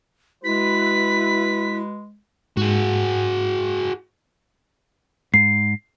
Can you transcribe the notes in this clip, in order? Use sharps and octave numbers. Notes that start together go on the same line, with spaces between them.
G#3 E4 F#4 B4 B6
G#2 F#4 G#4
G#2 C7